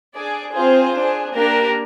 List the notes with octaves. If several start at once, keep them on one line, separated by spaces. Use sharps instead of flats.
D4 G#4 D5
C4 F4 G#4 C5
D4
G#4
A#3 D4 G4 A#4